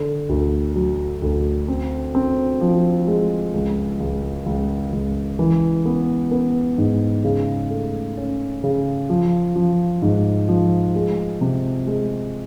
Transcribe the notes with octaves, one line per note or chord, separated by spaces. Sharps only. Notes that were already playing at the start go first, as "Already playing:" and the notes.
Already playing: D3
D2
F#3
D2
C4
C4
F3
G#3
C#2
C#2
C#2
C#2
E3
B3
B3
G#2
C#3
A3
C#4
C#3
F3
F3
G#2
F3
G#3
C3
G#3